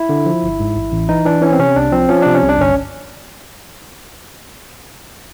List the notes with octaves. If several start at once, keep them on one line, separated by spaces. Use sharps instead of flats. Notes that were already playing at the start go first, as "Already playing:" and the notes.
Already playing: E4
D3
F3
G1
G#2
A1
A1
E3 D#4
E3 D4
E3 C#4
C4
C3 C#4
C2 D4
F3 C4
F3 C#4
C3 D4
C#4
C2
D4
G1 C#4